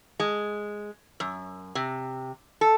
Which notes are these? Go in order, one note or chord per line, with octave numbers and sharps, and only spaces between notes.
G#3
F#2
C3
A4